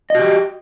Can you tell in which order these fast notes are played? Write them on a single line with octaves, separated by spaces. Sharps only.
D#5 F#4 G4